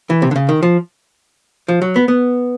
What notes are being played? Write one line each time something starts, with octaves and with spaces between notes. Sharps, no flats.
E3
C3
D3
C#3
D#3
F3
F3
F#3
B3
B3